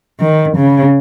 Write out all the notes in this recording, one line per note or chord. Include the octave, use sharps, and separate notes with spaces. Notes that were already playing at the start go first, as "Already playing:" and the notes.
D#3
C#3